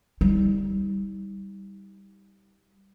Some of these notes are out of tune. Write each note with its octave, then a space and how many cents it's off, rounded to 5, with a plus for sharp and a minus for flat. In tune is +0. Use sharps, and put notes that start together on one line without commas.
G3 +0 D#4 +40